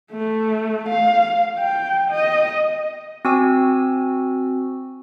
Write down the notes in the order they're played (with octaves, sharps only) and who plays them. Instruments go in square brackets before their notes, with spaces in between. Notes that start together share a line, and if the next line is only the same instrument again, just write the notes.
[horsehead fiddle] A3
F5
G5
D#5
[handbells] C4 F#4 G#5 E6